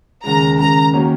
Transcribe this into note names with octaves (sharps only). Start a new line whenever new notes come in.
D#2 C#3 G#3 A#5
D#2 C#3 G#3 A#5
D#3 A#3 C#4 F#4